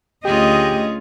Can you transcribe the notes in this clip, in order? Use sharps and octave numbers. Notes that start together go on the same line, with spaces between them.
D2 C#4 F4 G4 G#4 D#5